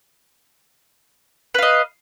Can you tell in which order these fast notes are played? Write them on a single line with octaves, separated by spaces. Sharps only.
B4 F5 D#5